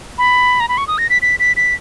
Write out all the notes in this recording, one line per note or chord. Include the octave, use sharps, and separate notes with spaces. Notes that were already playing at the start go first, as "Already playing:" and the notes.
B5
A#5
B5
C#6
D#6
A#6
B6
B6
B6
B6